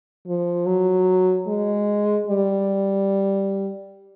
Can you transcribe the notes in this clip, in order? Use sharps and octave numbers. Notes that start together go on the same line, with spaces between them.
F3
F#3
G#3
G3